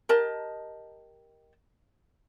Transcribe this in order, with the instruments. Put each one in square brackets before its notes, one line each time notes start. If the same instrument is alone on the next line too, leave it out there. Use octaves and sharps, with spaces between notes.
[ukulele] G4 A#4 D#5 A5